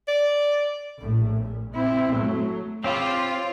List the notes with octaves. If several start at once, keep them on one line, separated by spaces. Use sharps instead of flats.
D5
A#1 A2
A#2
C4 E4
F#3 A3
C4 F4 G4 C5 C#5 F5 B5